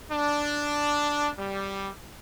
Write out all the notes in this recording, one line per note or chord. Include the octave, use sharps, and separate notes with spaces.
D4
G3